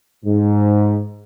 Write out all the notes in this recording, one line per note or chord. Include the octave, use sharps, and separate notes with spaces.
G#2